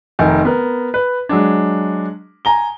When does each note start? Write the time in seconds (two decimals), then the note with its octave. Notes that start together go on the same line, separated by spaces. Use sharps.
0.19 F1 D#3 G#5
0.45 B3 A#4
0.94 B4
1.29 F#3 G#3 D4
2.45 G#5 A#5 G7